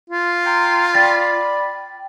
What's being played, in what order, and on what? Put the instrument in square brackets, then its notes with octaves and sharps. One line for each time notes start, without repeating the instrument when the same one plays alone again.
[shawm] F4
[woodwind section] G5 A#5 C6
[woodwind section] D5 B5 [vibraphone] G5 [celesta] A6